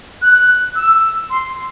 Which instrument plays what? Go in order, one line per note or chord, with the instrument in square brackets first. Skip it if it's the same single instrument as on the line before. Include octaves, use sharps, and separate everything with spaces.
[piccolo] F#6
E6
C6